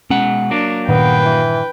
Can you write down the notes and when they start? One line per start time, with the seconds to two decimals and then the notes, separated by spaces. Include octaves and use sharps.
0.10 B2 G#3 C#4 F#5
0.51 F#3 A#3 D4
0.89 G2 A#2 D#3 B3 B4 G5
1.25 E3